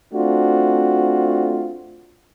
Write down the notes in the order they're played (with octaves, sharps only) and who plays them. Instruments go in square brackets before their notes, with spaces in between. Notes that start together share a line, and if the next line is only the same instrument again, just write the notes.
[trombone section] A3 C4 D4 F4 F#4